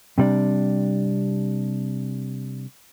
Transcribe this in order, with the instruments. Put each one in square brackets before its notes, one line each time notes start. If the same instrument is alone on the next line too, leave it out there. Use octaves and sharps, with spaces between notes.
[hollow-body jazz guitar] C3 G3 D4